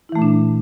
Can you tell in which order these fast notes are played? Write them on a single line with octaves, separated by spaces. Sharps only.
E4 E3 A3 A#2 D4